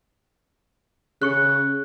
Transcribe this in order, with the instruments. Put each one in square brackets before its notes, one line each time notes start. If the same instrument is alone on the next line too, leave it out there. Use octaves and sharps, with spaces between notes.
[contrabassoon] C#3 [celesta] G#4 C#6 F#6